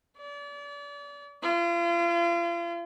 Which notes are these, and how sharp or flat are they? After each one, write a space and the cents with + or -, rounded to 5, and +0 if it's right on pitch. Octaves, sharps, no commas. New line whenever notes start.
D5 -35
F4 -40